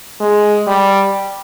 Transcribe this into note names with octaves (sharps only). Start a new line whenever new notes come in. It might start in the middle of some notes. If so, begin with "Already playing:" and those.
G#3
G3